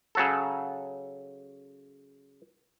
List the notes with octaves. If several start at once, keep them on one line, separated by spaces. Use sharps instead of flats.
C#3 F#3 A4